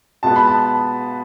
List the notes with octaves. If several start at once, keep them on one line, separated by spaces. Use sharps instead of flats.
B2 G#3 B3 A5
B5
A5